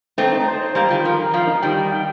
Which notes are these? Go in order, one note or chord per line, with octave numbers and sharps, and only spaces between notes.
A3 C4 D#4
D#4
C5
C5
G3 A#3 A#5
D#3 G3 F4
F3 A#4
A#4
F3 F5
D#4
D#3 G3 G5
D#4
G5